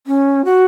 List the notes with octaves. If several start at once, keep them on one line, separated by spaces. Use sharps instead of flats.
C#4
F#4